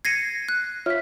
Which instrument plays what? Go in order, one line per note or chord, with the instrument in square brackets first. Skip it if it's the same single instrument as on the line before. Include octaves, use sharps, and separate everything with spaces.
[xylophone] G#6 A#6 D#7 [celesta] C7 C#7
[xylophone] F#6
[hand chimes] F4 C#5 E5 [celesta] F6 B6